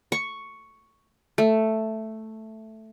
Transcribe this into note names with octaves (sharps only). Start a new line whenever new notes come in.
C#6
A3